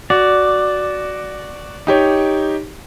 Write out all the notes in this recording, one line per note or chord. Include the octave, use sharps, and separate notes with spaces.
F#4 D5
D#4 G4 C#5